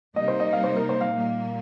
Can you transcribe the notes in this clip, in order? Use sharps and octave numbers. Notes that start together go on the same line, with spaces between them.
C3 G3 A#3 D#4 D#5
C5
D#5
F5
C5
A#4
C5
F5
A#2 G3 A#3